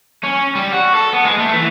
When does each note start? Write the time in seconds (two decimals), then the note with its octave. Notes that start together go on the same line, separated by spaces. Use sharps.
0.24 C#4
0.55 G3
0.72 F#4
0.95 A4
1.13 B3
1.25 G#3
1.39 A3
1.53 E3